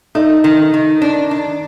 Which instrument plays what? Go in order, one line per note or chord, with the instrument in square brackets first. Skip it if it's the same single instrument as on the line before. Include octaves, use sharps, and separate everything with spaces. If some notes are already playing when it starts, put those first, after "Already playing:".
[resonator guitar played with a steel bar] A3 [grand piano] D#4
[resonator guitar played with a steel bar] D#3
D#3
D4
D4